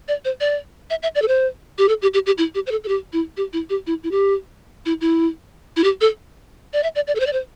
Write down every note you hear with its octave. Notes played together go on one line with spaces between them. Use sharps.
D5
C5
D5
E5
E5
D5
A4
C5
G4
A4
G4
G4
G4
E4
G4
C5
A4
A4
G4
E4
G4
E4
G4
E4
E4
G4
E4
E4
E4
G4
A4
D5
E5
D5
D5
A4
C5
D5
C5